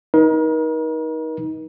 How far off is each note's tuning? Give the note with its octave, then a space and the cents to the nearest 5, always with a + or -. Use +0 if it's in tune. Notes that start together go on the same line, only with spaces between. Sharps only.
D#4 +20 A#4 +40